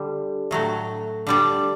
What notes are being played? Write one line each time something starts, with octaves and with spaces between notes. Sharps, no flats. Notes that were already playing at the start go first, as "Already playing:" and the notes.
Already playing: D3 G3
A2 F#3 A3
D3 G3 D5